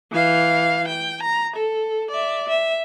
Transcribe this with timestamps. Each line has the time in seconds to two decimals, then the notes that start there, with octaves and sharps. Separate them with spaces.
0.12 E3 F5
0.88 G5
1.23 A#5
1.56 A4
2.11 D5 E5
2.49 E5